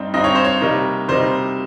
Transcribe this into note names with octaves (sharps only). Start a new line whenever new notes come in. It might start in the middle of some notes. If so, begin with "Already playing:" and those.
Already playing: G2 G3 C4 D#4
G2 G3 C4 D#4 D#5
C#5
C5
C#5
C3 G3 A#3 D#4
C3 G3 A#3 D#4 C5